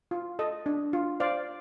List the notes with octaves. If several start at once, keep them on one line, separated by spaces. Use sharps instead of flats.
F4
A4 D#5
D4
F4
C5 D5 F5